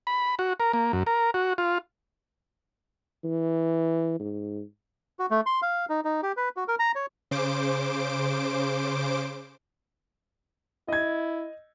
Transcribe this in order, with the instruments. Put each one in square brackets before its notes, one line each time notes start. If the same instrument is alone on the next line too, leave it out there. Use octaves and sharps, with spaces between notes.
[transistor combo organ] B5
F#4
A#4
A#3
F#2
A#4
F#4
F4
[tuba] E3
G#2
[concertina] F#4
A3
C6
F5
D#4
D#4
G4
B4
F#4
A#4
A#5
C#5
[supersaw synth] C#3 C5 D6 D7
[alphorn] E4 [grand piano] D#5 G#6